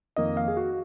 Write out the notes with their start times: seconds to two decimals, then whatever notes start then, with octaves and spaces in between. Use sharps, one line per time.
0.16 F2 D#3 A#3 D#4 D#5
0.37 F5
0.48 G#4
0.57 F#4